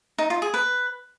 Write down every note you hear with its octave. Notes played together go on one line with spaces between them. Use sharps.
D#4
F4
G#4
B4